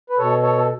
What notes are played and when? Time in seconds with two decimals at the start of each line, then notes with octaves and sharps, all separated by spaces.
0.10 B4
0.18 B2 A4 C#5
0.43 A4 C#5
0.58 A4